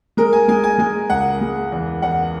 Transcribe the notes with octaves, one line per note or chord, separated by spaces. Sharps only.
G#3 A#4
G#5
G#3 G#5
G#5
G#3 G#5
C#2 F#5
G#3
E2
E2 F#5